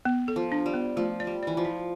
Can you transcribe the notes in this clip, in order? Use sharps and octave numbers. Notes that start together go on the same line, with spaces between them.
B3
A4
F3
D4
G3
B3
F3 A3
D5
G3
E3 D5
F3
E4